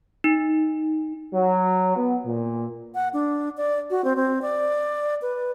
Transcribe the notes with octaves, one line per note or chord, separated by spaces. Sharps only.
D#4
F#3
B3
A#2
F#5
D4
D5
F#4
C4
C4
D5
B4